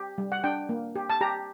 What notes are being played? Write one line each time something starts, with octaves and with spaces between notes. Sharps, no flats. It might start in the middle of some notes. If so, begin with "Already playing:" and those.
Already playing: G4
G3
F#5
D4 G5
A#3
G4
A5
G4 A#5